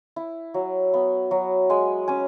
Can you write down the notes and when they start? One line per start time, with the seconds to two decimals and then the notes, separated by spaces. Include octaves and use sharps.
0.16 E4
0.54 F#3
0.94 B3
1.31 F#3
1.70 G#3 G#5
2.08 C#4 G#5